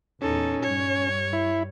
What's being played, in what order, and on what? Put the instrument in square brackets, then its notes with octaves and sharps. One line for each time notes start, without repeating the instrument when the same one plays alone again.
[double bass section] E2 A#2 [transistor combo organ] C#4 [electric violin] D#4 A4
[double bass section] G2 G3 [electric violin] C#5
[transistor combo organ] E4